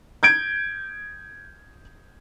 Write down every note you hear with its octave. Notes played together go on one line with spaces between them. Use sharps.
G6 G#6 D7